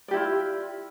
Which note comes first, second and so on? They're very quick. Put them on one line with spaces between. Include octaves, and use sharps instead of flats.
D5 G4 E4 F4